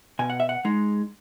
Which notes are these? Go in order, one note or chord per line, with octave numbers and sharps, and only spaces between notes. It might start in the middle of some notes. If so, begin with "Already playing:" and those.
B2 G#5
F#5
E5
F#5
G#3 D#4